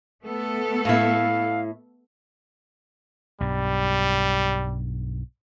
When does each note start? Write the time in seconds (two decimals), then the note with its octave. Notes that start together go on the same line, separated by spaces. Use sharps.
0.21 A3 B3 A4
0.85 A2 E4 F5
3.40 B1 G2 G3